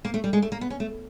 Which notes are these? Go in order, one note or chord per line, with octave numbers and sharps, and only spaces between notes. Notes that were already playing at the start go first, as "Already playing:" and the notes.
A#3
A3
G3
G#3
A3
A#3
B3
C#4
A3